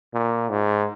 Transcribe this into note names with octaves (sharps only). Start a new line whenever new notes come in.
A#2
G#2